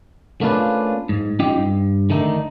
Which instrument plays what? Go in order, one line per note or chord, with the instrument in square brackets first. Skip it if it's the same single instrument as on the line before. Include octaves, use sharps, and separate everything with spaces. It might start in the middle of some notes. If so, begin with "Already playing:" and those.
[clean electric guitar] A3 A#3 C#4 D4 F4 B4
G#2
C#4 D#4 F4 G4 D#5 G5
G2
D3 D#3 A3 D#4